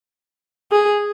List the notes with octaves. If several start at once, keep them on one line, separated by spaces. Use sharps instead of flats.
G#4